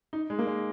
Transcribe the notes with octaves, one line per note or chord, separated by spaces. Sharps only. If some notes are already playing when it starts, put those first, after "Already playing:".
D#4
G#3
A#3
G#3